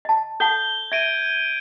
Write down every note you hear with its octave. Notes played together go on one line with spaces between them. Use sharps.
D#5 A5
A4 F#5 A5 G6 G7
E5 G#6 D7 D#7